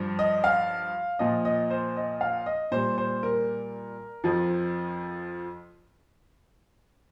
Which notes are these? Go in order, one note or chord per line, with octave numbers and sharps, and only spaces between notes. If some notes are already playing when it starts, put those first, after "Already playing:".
Already playing: G2 F3
D#5
F5
A#2 F3 D#5
D#5
C5
D#5
F5
D#5
A#2 G3 C5
C5
A#4
F2 F3